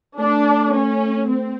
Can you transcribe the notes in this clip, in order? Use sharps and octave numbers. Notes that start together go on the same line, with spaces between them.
A3 D4
C#4
C4